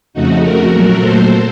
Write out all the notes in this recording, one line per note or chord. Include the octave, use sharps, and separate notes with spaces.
F2 C#3 A3 D#4 F#4
F#4 A#4
A#2 F#3 A3
A4 C5